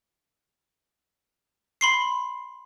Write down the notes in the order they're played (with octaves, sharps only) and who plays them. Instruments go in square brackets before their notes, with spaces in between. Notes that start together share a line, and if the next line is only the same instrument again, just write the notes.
[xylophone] B5 C6 C7